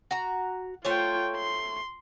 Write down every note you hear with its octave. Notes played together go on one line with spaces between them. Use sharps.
F#4 A#5
A3 F4 C5 C#5 G5
C6